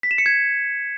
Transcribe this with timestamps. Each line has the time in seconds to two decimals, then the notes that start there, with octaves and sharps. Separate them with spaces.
0.03 B6
0.11 E7
0.18 C#7
0.26 G#6